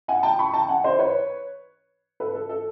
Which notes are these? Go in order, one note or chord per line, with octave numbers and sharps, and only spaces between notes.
F#5 G#5
G5 A5
B5 C#6
G5 A5
F#5 G#5
C5 D5
B4 C#5
A4 B4
A4
A4